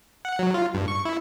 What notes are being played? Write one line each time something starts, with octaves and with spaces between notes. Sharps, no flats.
F#5
F#3
F4
G2
C#6
E4